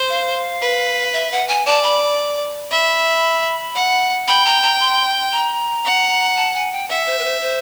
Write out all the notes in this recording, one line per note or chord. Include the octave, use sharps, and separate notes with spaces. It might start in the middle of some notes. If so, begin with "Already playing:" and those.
Already playing: C5
F5
B4
E5
F#5
G#5
D5 A5
B5
E5 B5
F#5
G5 B5
A#5
A#5
C6
A#5
F#5
A5
G#5
G5
E5 F#5
C5
B4
C5
C5